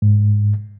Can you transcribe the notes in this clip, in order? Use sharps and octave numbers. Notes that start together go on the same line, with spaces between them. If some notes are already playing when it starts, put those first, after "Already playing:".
G#2